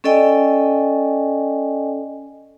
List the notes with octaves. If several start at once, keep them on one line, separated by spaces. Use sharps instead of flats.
C#4 A4 D5 D#5 G5 G#5